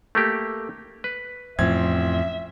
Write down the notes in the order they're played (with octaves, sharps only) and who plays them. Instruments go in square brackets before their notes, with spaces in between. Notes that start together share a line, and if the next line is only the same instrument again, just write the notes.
[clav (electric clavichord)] A3 A#3 G4
B4
[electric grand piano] A1 C4 G#6 [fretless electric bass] F2 A2 F3 [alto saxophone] E5